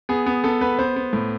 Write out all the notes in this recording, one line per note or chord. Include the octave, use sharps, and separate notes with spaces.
B3 G#4
B3
B3 A4
B3 B4
B3 C5
B3
A2